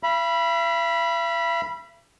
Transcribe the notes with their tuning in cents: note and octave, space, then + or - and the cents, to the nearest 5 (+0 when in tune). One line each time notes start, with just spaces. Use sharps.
E5 +45 B5 -15